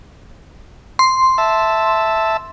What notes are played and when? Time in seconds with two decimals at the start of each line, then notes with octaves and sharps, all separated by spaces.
0.99 C6
1.38 E5 A5